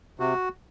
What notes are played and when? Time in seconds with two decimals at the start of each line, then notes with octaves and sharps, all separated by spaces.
0.19 C3 F#4